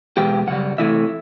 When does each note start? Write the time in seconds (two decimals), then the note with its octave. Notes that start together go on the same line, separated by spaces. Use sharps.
0.17 E2 B2 G#3 B3 G4 G5
0.47 F#2 C#3 G3 F#5
0.78 C3 E3 A3 E4 E5